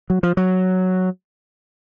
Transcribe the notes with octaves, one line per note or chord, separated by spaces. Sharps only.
F#3
F3
F#3